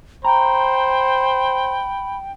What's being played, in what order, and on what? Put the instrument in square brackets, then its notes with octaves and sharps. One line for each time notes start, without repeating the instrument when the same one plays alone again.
[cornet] C5 [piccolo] G5 [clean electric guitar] A#5 [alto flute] B5